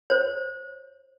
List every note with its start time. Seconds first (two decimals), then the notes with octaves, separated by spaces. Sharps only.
0.10 C5 C#5